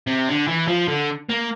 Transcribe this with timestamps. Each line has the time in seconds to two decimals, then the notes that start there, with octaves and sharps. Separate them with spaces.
0.07 C3
0.28 D3
0.47 E3
0.68 F3
0.88 D3
1.29 A#3